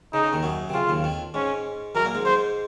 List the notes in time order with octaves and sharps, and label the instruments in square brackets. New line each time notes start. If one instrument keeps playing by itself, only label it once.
[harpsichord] C#3 [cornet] D#4
[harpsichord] C#3
D#2 D#3
F#2 F#3
C3
[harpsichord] C#3 [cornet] F4
[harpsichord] D#2 D#3
F2 F3
[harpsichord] G#2 G#3 [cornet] C#4
[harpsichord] F#2 F#3 [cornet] A#4
[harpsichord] A#2 A#3
G#2 G#3
[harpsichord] G#2 G#3 [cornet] C5